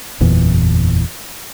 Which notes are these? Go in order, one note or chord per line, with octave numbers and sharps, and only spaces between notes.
F#1 E2 A#2 E3